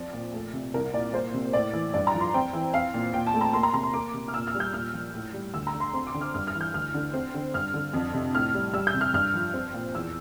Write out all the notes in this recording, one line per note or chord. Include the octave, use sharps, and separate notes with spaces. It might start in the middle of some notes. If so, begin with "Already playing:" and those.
Already playing: F3 C4 D5
A#2
A3
C3
C2 A#4
A#2 D5
A#3 C5
C3
A2 D5
E3
G2 D5
A#5
F3
C6
C4 G5
E3
C4 F5
A#2
A#2 G5
A5
A3
A#5
A#3 C6
A#5
C3 A#5
C6
A#3 D6
C3
F6
A#2 E6
F6
G3
G6
A#2 F6
F3
A2
G3
D2 E6
A#5
D3
C6
C4 C6
D6
D3
F6
G2 F6
F6
E3
G6
D2 F6
D3
C4
D3
G2 F6
D3
F2
C3
A2 F6
G3
G3 E6
G6
C3
F6
G2 F6
F3
C4
A#2
E2 E6